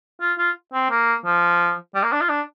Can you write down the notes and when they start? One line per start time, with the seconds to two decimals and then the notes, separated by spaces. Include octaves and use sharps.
0.21 F4
0.38 F4
0.73 C4
0.90 A#3
1.26 F3
1.95 G3
2.03 A#3
2.12 D4
2.21 F4
2.29 D4